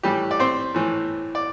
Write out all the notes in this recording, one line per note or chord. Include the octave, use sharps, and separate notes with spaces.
A2 E3 G3 G4
D5
C4 C5
A2 E3
D5